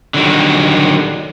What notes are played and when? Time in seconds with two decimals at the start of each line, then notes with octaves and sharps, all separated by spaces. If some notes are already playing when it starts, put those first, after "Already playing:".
0.14 D3 D#3 F#3 G3